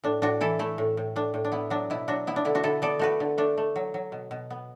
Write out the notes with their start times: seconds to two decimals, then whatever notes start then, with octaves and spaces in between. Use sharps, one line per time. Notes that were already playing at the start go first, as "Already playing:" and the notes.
0.04 A2 D4
0.22 A2 D4 F#4
0.41 E3 E4 A4
0.59 A3 E4
0.78 A2
0.97 A2
1.16 A2 D4
1.34 A2
1.45 D4
1.52 B3 E4
1.70 F#3 D4
1.90 B2 E4
2.08 F#3 D4 F#4
2.27 B3 E4
2.36 D4
2.45 D3 E4
2.55 D4 F#4
2.63 D3 E4 A4
2.82 B3 A4 D5
2.99 A3 F#4 B4
3.20 D3
3.38 A3 D4
3.58 A3
3.76 F#3
3.94 F#3
4.12 B2
4.31 B2
4.50 B3